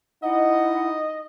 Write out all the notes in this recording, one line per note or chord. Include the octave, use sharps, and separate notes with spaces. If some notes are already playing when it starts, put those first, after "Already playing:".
D#4 E4 D#5 F#5